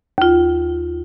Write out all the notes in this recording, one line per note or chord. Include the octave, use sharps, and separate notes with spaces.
D#2 F4